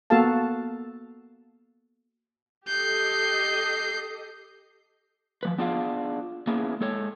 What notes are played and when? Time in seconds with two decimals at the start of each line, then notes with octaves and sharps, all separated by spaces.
0.10 A#3 B3 F#4 A4 F5 A5
2.68 G4 A4 D#5 G6 C7
5.43 F3 G3 B4
5.58 B3 D4 F4 G#4 F5
6.47 A#3 B3 C#4 E4 G#4
6.81 G#3 A4 C#5